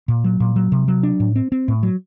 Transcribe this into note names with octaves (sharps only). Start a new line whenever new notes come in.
A#2
F#3
A#2
F#3
C3
F#3
D4
A2
C4
C4
A2
F#3